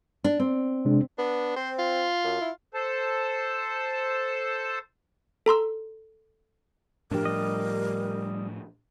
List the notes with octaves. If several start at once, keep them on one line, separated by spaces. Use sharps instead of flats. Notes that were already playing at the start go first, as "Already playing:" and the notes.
D4
C4
C3 G#3 D4
B3 D4
C4 C5
F4
F#2
E4
A4 C5 A5
A4 A#5 C6 E6
A2 F3 D4 G4 A#4
G3 D#5